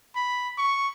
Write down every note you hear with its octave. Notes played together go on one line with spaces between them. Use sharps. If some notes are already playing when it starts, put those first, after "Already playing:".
B5
C#6